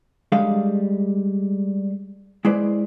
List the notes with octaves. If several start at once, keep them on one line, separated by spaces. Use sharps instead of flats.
G3 G#3 D4 A4 F5
G#3 E4 B4 C5 D5